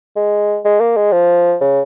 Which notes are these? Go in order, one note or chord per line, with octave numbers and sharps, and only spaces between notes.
G#3
G#3
A#3
G#3
F3
C#3